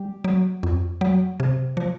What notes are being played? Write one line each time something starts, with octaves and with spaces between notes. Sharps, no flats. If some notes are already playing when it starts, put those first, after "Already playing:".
Already playing: G3
F#3
F2
F#3
C3
F3